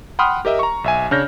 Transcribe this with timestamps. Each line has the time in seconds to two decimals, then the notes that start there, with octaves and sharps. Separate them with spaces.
0.19 F#5 G5 B5 C6 D#6 F6
0.45 G4 A#4 D#5 E5
0.59 A#5 C#6
0.84 B1 E5 G#5
1.11 C#3 D4 C#5 F6 G6 A#6